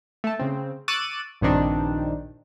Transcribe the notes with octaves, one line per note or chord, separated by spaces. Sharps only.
A3 A5
C#3 C4
C#6 D6 E6 F#6 A6 D#7
A#1 G2 D#3 C4 D4 D#4